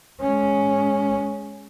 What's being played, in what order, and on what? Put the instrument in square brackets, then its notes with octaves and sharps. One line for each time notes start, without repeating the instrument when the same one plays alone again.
[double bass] G#3 C#4